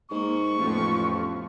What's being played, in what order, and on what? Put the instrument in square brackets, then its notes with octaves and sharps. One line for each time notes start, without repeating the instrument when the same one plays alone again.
[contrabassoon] G#2 [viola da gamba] A#3 [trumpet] C#6
[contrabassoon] A1 [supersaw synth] F2 F3 [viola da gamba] A2 A3 B3